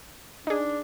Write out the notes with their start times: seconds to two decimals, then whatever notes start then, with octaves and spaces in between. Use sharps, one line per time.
0.47 D4 D#4 G#4